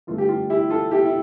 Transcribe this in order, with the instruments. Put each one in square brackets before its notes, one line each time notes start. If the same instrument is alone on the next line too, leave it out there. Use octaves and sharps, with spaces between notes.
[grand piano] G2 D3 A3 F4
G4
F4
E4 G4
F4 A4
E4 G4
E4